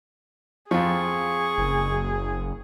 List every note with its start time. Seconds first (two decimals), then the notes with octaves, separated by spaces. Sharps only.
0.71 F2 F3 G#4 C#6
1.58 F#1